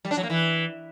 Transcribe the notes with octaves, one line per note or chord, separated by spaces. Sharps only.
G3
D4
F#3
A#3
E3